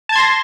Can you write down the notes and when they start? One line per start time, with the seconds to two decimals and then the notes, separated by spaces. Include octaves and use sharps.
0.09 A5
0.12 G#6
0.15 C6
0.19 A#6